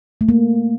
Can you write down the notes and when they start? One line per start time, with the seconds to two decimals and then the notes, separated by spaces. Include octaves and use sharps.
0.21 A3
0.29 A#3